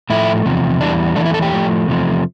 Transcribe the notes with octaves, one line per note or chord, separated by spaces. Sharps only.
A2 F3 A3 E4
E2 C3 F3
E2 E3 G3 D4
E2 E3 A3 D4
E4
A4
G4
A2 F3 A3
E2 C3 F3 A3